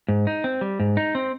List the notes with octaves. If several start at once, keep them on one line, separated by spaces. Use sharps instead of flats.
G#2
D#4
C4
G3
G#2
D#4
C4